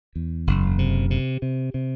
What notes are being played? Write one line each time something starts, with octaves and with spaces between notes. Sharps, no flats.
E2
F#1
C3
C3
C3
C3